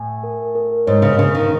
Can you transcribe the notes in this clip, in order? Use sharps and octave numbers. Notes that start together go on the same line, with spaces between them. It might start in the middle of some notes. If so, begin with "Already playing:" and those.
Already playing: A2 G#5
A#4
A#4
G#2 C#5
C#3
C#3 A#4
D#3